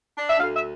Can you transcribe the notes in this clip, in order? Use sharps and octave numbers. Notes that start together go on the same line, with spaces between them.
D4
E5
D2 F5
E5